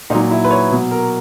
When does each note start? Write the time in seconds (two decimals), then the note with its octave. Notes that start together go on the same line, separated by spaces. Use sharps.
0.10 A#2 D#4
0.15 F#3
0.31 E4
0.44 B4
0.51 C#5
0.71 B2 F#3
0.91 A#4